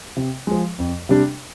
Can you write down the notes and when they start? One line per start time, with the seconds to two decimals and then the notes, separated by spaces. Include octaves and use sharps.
0.17 C3
0.47 F3 G#3
0.78 F2
1.09 C3 G3 D4